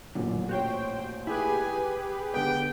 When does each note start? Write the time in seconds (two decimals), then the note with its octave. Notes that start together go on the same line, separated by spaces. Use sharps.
0.15 A1 F#2 A#2 D3
0.49 F#4 G4 C5 C#5 G5
1.27 E4 G4 G#4 B4 G#5
2.34 D3 B3 G5